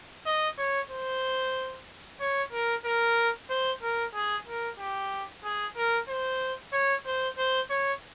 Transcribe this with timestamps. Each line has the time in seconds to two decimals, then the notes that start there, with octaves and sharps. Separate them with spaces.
0.26 D#5
0.58 C#5
0.90 C5
2.20 C#5
2.53 A#4
2.85 A#4
3.50 C5
3.82 A#4
4.14 G#4
4.47 A#4
4.79 G4
5.44 G#4
5.76 A#4
6.09 C5
6.73 C#5
7.06 C5
7.38 C5
7.70 C#5